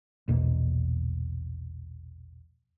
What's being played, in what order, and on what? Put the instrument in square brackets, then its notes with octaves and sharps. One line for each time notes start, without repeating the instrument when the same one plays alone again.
[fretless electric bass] A#1 E2 B2 A#3